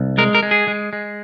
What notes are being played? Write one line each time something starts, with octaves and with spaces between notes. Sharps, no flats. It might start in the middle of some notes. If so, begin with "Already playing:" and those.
Already playing: C2
G#3 A#4
A#4
G#3
G#4
G#3
G#3